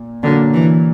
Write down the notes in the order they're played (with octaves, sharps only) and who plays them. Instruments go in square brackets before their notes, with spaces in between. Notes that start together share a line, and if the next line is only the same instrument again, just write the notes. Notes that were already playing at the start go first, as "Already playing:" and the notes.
Already playing: [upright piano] A#2
[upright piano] A#2 F#3 A#3 [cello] D3
[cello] E3